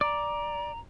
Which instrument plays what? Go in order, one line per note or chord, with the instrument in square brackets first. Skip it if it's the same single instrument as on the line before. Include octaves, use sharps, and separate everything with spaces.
[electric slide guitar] D5 [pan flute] A#5